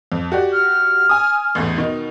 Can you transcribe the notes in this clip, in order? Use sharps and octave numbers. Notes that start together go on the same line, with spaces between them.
F2
F#4 G4 D5
F6
G#5 D#6
A1 E2 A2
B2 D#3 D#4